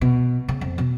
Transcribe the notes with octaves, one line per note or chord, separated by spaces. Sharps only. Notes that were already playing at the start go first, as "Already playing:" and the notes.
B2
C#3
F2
B2